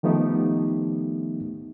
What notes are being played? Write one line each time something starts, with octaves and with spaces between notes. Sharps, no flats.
D#3 F3 A3 B3 D#4 G4